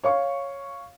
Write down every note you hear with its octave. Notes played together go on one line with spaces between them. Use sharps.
C#5 F5 C#6